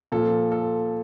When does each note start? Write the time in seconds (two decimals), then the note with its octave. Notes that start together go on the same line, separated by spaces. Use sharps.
0.12 A#2 F3 A4
0.52 A4